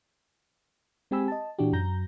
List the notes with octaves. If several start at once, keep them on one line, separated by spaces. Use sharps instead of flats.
G#3 C4 G4 G#5 B5 E6
D#5 A5
A#2 E3 D4 F#4 G4
F#2 F#3 A#5 G6 A#6